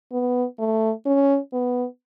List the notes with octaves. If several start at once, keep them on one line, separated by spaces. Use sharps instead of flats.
B3
A3
C#4
B3